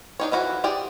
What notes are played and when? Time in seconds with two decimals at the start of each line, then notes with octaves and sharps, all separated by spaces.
0.20 D4 D#4 C#5
0.31 E3 F3 E4 F#4 A4
0.64 G4 G#4 D5